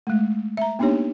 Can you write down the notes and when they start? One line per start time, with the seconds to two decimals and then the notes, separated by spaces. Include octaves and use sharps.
0.07 G#3 A3
0.57 E5 A#5
0.79 A#3 B3 D4 D#4 G4 C#5